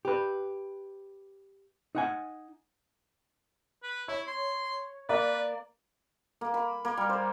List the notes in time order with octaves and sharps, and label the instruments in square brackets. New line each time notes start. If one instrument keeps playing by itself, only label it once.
[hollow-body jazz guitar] G4 B4
D#4 F#5 G#5
[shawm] B4
[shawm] E4 [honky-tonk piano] C#5
[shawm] C6
[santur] A#3 [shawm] B4 [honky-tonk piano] D5
[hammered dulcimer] A#3
B5
A#3
G3
C5